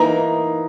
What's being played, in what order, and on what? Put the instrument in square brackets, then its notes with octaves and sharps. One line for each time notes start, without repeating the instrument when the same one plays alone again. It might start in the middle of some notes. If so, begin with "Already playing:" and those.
Already playing: [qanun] E3 A#3 D#4 [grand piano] A#5